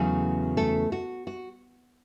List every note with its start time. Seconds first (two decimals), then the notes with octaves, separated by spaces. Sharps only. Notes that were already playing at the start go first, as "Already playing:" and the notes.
Already playing: E2 C#3 F#3 A3 F#4
0.57 A3 A4
0.92 F#4
1.27 F#4